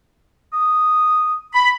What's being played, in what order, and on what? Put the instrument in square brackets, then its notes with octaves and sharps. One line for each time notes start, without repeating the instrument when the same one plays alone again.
[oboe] D#6
[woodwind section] B5